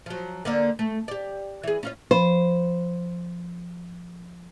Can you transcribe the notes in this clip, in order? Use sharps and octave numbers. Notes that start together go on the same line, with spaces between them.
F3 F#3
D3 A#3 D5
A3
G4 D5
E3 G#4
C#4 F4 C#5
F3 C5 B5